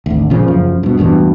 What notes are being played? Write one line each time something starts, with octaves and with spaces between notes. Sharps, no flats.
G#1 D2
A#2 C#3 F3
F1 F#2 C#3 F3
G2 B2
E1 A1 G2 B2